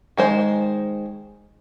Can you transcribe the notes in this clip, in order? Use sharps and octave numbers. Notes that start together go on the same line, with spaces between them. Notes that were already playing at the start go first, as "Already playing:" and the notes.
D#3 G#3 C5